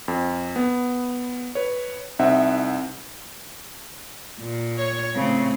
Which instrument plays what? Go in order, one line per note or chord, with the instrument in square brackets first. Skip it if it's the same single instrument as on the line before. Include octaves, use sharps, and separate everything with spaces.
[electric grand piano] F2
B3
B4 C#5
C2 C4 D#4 E5 F#5
[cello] A#2
[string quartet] C#5
[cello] A2 C4 [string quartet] C#3